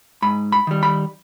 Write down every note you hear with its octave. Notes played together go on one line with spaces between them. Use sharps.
G#2 B5
B5
D#3 G3
B5